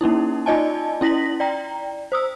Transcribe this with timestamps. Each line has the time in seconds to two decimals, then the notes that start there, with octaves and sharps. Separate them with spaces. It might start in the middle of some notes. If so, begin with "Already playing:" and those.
0.01 A#3 C#4 D#4 E4
0.46 D#4 F4 D5 D#5 G#5 A5
1.01 C#4 E4 A#6 B6 F#7
1.40 D5 G5 A#5
2.12 C5 D#6 E6